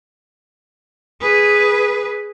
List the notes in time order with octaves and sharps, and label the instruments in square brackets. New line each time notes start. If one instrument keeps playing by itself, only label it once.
[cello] G#4 B4